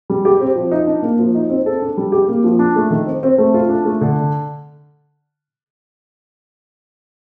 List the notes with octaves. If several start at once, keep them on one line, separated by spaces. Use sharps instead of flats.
G3
G4
C4
F3
D#4
D4
A#3
F3
D#4
C4
A4
D4
G3
G4
A#3
F3
D4
A3
D#3
C4
C4
A3
F4
D4
A3
D3